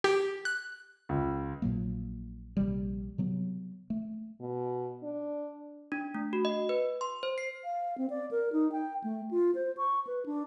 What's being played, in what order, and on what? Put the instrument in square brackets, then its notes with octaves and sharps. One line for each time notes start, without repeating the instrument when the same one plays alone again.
[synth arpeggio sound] G4
F#6
[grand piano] C#2
[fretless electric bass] A#1 A#2 F#3 A#3
A#1 C3 G3
C3 F#3 B3
A3
[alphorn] B2
D4
[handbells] D4
A3
F#4
D#5
B4
C6
C5
C7
[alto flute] F5
C4
D5
A#4
D#4
G5
A3
F4
C5
C#6
B4
D4